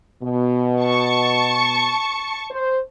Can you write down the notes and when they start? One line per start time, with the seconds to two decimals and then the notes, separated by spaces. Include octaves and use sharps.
0.22 B2
0.83 A5 C#6 C#7
2.51 C5